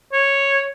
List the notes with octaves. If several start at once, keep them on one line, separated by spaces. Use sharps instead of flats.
C#5